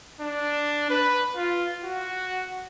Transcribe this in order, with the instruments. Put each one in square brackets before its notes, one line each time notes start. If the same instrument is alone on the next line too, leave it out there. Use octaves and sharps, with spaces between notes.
[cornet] D4
B4
F4
F#4